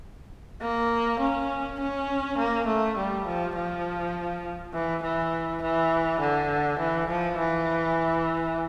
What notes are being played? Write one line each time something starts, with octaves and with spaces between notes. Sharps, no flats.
A#3
C#4
C#4
A#3
A3
G3
F3
F3
E3
E3
E3
D3
E3
F3
E3